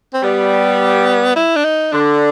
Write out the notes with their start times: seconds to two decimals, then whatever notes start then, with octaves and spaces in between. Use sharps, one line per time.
0.14 C4
0.22 G3 B3
1.36 E4
1.56 D4
1.64 D#4
1.92 D3 D4